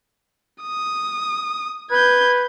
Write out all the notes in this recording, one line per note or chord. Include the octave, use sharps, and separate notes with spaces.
D#6
B4 G6 G#6